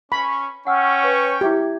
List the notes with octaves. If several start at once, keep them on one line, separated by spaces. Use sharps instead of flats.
C#4 B5 C#6
C#4 F#5 G5 C#6 E6 F6
B4 C#5
E4 G4 E5 G#6